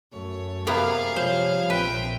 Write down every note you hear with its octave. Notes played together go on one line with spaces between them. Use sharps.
F#2 A3 C#5
C3 A#3 B3 G#4 F5
C3 F3 G3 C5 C#5
A#1 C4 B4 E5 G5